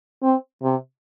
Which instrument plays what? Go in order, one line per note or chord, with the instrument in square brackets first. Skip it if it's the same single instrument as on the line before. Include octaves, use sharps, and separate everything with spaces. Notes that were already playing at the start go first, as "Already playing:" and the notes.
[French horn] C4
C3